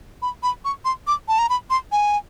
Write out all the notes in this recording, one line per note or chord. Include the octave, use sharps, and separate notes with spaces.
B5
B5
C#6
C6
D6
A5
A#5
B5
C6
G#5